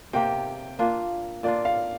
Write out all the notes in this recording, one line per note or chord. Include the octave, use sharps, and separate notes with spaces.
C3 A#3 G4 G5
A#2 A#3 D4 F4
A#2 A#3 D4 F4 D5
F5